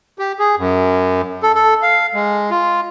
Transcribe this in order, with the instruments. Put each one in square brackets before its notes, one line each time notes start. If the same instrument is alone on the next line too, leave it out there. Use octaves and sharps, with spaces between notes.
[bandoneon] G4
G#4
F#2
A4
A4
F5
G#3
F4